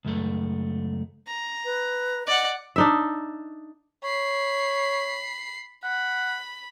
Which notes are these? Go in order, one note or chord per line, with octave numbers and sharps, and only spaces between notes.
C#2 F#2 A3
A#5
B4
D5 D#5 F#5
D4 D#4 E5
C#5 B5 C7
F#5 B5